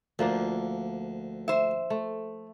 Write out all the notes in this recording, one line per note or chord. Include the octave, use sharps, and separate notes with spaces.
D2 F3 A#3 D4
C5 E5
A3